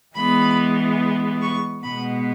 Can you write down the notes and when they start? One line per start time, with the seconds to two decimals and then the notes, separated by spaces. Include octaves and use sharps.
0.15 E3 G#3 B3 B5
1.41 C#6
1.83 B2 G#3 B3 B5